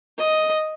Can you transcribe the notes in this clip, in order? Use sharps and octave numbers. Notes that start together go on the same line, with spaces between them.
D#5